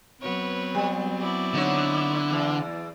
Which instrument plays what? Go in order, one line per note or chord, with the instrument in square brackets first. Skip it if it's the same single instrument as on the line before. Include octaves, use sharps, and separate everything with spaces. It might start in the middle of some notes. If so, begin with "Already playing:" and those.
[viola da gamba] F#3 B3 C4 [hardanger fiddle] B4 C#5
[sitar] G3
[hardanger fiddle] E4 D5
[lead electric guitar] D3 [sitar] D#4 C#5
[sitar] E2